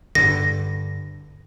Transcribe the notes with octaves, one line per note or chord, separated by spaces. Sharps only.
G2 D3 A#6